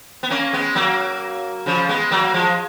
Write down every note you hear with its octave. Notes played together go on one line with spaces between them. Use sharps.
B3
A#3 C#4
G#3 B3
F#3 A#3
C#3 F3
G#3 B3
F#3 A#3
F3 G#3